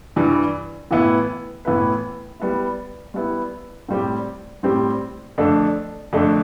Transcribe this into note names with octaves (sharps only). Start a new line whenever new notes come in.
G2 E3 G3
A2 E3 B3 E4 B4
A2 E3 B3 E4 B4
G3 B3 E4
G3 B3 E4
A2 G3 C4 G4
A2 G3 C4 G4
F2 D3 A3 D4 A4
F2 D3 A3 D4 A4